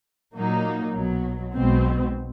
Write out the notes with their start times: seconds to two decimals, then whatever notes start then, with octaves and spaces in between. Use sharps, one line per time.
0.34 A#2 F#3 A#3 D#4
0.93 B1 B2 F#3
1.53 B1 B2 G#3 C4